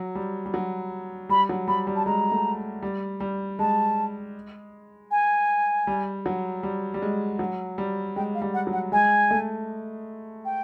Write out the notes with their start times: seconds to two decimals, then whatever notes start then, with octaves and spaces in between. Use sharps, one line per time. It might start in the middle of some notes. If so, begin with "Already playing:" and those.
Already playing: F#3
0.15 G3
0.46 G3
0.54 F#3
1.29 G3 B5
1.49 F#3
1.68 G3 B5
1.87 G3
1.96 A5
2.06 G#3 A#5
2.32 A3
2.83 G3
3.20 G3
3.59 G#3 A5
5.11 G#5
5.87 G3
6.26 F#3
6.63 G3
6.94 G3
7.02 G#3
7.39 F#3
7.78 G3
8.16 G#3 G5
8.35 F5
8.42 G3
8.54 F#5
8.67 F#3
8.73 F#5
8.92 G#3 G#5
9.31 A3
10.45 G5